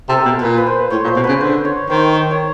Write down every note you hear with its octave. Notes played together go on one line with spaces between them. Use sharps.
C3 A4
A#4
B2
A#2 B4
B4
C5
A2 C#5
A#2
C5
B2
C#3 B4
D3 C5
C#5
D#3 C5
C#5